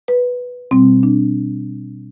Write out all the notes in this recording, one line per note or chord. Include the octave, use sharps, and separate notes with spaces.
B4
B2 G3 C4
D4